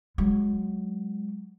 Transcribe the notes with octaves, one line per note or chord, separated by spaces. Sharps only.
F#3 G#3